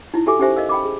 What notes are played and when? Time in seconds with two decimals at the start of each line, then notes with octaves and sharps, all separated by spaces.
0.14 D#4 E4
0.26 F#4 G4 A4 E5 G#5 D6
0.39 C#4 D#4 G4 C5 E5 G#5
0.56 A#4 D#5 F5 E6
0.69 G5 B5 D6
0.85 G#4